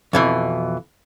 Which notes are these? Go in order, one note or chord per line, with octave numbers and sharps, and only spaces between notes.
F2 B2 E3